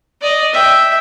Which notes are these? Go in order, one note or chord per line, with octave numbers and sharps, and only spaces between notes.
D5 D#5
E5 G5